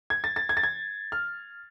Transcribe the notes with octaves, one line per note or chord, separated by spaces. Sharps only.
G#6
A6
A6
G#6
A6
G#6
F6